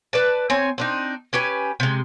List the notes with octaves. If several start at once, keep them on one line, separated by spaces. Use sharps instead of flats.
B4 D5 A5
C4 C#5 G#5
C4 D4 D#4
C#4 G4 B4 G#5
C3 G#3